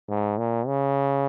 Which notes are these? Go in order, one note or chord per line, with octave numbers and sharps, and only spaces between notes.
G#2
A#2
C#3